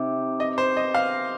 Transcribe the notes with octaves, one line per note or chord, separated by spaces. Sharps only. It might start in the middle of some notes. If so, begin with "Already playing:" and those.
Already playing: C3 D#4 G4
D#5
C5
D#5
F5